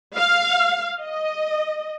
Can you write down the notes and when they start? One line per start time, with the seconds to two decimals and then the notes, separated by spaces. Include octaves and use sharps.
0.16 F5
1.02 D#5